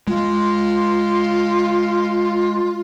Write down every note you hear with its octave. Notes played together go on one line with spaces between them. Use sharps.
G#3 F4